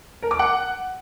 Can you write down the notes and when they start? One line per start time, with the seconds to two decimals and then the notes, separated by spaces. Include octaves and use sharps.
0.23 A#4
0.31 D6
0.39 F#5